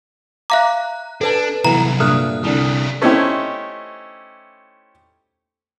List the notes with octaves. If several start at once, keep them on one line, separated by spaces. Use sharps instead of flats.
E5 F5 A#5 D6 F#6
D4 A4 B4 A5
C2 E3 F#3 B3 A#5
G2 A#2 A3 D#6 F6 F#6
C2 D3 G3 A3
A3 C#4 D#4 E4 G4 C5